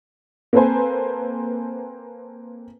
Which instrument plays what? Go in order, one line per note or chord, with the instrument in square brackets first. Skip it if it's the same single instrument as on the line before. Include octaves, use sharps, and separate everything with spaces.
[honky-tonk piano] A#3 C4 A4 B4 C5 G#5